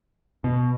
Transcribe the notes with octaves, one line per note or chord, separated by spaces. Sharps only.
B2